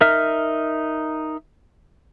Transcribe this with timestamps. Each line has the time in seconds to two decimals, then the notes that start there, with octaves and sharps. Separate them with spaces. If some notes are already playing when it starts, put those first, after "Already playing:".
0.01 D#4 A#4 E5 F6